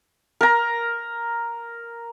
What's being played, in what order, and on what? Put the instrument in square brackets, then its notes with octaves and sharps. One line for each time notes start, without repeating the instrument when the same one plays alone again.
[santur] A#4 A#5